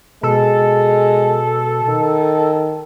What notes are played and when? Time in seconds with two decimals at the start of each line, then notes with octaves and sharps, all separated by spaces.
0.23 B2 G#3 A4
1.89 D#3